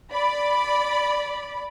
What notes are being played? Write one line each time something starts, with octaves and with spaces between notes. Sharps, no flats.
D5 B5